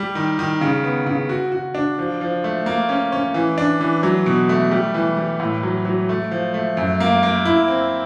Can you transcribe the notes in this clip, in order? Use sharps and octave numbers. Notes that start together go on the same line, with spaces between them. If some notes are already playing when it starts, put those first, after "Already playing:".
Already playing: G3
D#3
D#3
C#3
B3
C#3
F#4
F#4
D4
F3
F3
A3
A#3
C#4
C#4
E3
D4
E3
F#3
B2
A3
G3
E3
G3
A2
F#3
F#3
A3
F3
A3
F#2
A#3
A#3
E4
C4